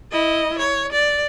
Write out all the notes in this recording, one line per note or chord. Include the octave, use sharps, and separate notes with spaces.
E4 D#5
C#5
D5